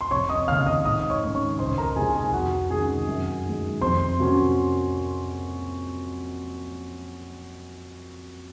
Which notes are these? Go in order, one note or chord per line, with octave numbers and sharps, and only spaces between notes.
C6
F1 C#5 C#6
D#5 D#6
D#2 C#3 F5 F6
D#5 D#6
G#2 D#5 D#6
C#5 C#6
D#3 G#3 C#4
C#5 C#6
C#2 C5 C6
A#4 A#5
C3 F3 G#3 D#4 G#4 G#5
G#4 G#5
F2 F#4 F#5
C3 D#3 G#3 C#4 G#4 G#5
F#2
D#3 G#3
F2 C5 C6
C3 F#3 A#3 C#4